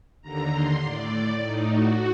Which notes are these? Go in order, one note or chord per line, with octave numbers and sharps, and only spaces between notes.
D#2 D3 A#5
C6
A2 D5
A2 D#4
F#4